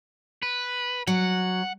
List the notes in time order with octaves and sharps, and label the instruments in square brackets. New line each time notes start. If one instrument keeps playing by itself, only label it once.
[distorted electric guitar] B4
[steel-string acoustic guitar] F#3 [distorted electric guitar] F#5